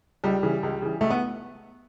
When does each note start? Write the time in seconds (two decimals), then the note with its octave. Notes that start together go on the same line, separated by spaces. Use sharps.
0.24 C#2 G3
0.43 C#3 E3
0.63 C#2
0.82 C#3 E3
1.01 C#2 A3
1.10 B3